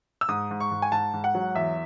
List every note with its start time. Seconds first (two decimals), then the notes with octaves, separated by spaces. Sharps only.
0.21 E6
0.29 G#2 D#6
0.51 G#2
0.60 C#6
0.71 G#2
0.82 G#5
0.92 G#2 A5
1.14 G#2
1.24 F#5
1.35 F#3
1.55 E2 E5